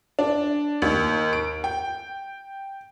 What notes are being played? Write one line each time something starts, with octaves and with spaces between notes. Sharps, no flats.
D4
D#2
D7
G5